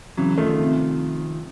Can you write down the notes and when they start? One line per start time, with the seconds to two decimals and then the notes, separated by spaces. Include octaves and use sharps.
0.17 C#3 E3 F#3
0.38 D#3 F3 A3
0.58 C3